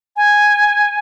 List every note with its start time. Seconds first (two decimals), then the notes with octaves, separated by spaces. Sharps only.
0.16 G#5